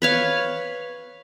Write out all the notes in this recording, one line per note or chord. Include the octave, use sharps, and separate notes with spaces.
B4 C#5 F5